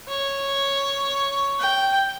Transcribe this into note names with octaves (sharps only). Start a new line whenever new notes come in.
C#5
G5